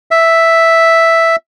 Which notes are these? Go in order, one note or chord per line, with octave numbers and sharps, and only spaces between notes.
E5